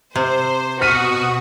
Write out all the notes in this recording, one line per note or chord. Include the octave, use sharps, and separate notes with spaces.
C3 C5
B2 F#4 C#6 D#6 F6 B6 D#7